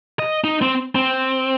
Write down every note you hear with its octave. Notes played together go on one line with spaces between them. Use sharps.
D#5
D#4
C4
C4